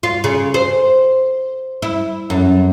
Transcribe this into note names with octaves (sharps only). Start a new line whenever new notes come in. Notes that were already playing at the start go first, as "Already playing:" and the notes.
F4
C#3
C5
E4
F#2